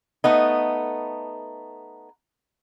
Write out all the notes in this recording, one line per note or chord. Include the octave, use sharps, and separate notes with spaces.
A3 B3 D#4